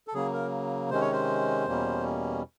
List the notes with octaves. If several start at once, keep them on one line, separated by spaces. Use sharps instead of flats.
A4
C#3 F#3 A#3 G#4
A#4
C3 D#3 G#3 C#4 C5
C#5
C5
E2 B2 G3 A#3 C#4